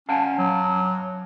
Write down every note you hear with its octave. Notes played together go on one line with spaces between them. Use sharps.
C#4 F5 F#5 A5
F#3